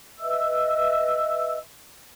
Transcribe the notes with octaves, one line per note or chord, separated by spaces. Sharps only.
B4 D#5 E5 E6